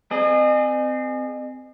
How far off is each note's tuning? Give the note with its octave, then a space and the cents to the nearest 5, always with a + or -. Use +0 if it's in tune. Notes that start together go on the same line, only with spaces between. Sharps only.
C4 -25 G#4 +0 D#5 -40